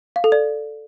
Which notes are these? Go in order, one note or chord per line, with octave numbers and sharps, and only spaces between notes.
F5
A4
D5